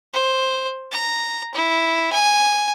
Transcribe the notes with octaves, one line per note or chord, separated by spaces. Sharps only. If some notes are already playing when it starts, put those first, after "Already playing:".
C5
A#5
E4
G#5